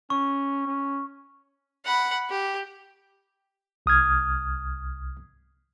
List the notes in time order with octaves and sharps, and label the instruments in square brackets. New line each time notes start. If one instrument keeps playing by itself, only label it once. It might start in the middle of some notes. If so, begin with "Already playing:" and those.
[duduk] C#4 [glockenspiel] C#6
[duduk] C#4
[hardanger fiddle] F#5 B5
G4
[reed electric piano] C2 D#6 F6 G#6